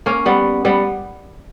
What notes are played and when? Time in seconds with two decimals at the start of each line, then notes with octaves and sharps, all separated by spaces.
0.06 A#3 C#4
0.26 G3 B3
0.65 G3 B3